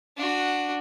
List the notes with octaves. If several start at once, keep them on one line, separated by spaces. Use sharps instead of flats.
D4 F#4